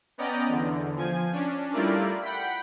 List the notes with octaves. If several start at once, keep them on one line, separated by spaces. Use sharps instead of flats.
B3 C#4 D5 D#5 G5 A#5
E2 D3
F3 G#5 G#6
C#4 D4
G3 A3 E4 F4 A#4 D5
F#5 G5 B5 B6